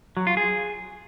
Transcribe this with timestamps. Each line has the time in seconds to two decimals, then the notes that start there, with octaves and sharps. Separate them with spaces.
0.17 F#3
0.27 F4
0.37 G#4